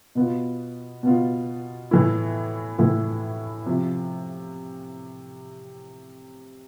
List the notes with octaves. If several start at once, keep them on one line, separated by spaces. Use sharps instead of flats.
B2 B3 F4
B2 B3 F4
A2 E3 A3 E4
A2 E3 A3 E4
C3 F3